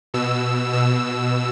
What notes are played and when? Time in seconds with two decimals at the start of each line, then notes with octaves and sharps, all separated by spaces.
0.14 B2 E6
0.73 B2 E6